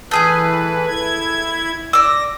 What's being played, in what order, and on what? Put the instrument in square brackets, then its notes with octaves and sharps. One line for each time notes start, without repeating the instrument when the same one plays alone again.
[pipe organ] E3 B4 [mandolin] A3 G#4 G#5
[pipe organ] E4 G#6
[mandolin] D5 E6 [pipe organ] A#6